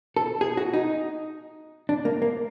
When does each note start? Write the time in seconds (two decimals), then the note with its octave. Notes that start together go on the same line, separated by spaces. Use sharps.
0.16 A4
0.41 G#4
0.57 F#4
0.73 D#4
1.89 D4
2.05 A#3
2.22 A#3